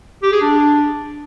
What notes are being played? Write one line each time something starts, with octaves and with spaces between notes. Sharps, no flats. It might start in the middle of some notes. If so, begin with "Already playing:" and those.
G4
G#4
D4